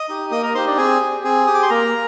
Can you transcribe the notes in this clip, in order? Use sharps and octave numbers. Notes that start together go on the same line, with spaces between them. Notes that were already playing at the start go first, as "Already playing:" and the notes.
Already playing: D#5 D#6
D#4 G4
A#3 D#5 D#6
A#4 A#5
D#4 G4 C5 C6
D4 D5
C4 G#4 G#5
G4
C4 G#4 G#5
G4 D#6
D6
C6
A#3 A#4 A#5